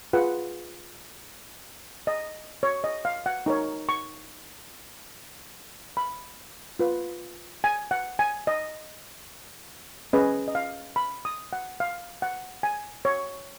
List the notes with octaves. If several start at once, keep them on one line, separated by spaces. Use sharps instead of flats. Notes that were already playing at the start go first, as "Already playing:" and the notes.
F4 G#4 B4 F#5
D#5
C#5
D#5
F5
F#5
D#4 A#4 C#5
C#6
B5
F4 B4
G#5
F#5
G#5
D#5
C#4 G#4 B4 D#5
D#5
F5
B5
D#6
F#5
F5
F#5
G#5
C#5